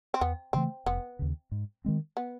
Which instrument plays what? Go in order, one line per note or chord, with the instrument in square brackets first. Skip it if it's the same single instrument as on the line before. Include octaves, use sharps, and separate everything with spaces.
[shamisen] C4
[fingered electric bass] E2 [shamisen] B3
[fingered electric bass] C#3 E3 A3 [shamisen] C4
[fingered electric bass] F1 [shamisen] B3
[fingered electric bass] D#2 C#3
G#2
D#3 G#3 C4
[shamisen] B3